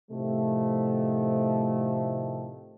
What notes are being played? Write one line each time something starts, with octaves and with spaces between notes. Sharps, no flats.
A2 C3 D#3 F3 A3